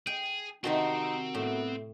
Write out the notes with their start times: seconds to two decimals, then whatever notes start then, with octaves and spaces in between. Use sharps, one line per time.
0.07 G#4 G5
0.64 C3 D#3 C4 D#4 F#4 A#4 A5 C6
1.35 A2 B3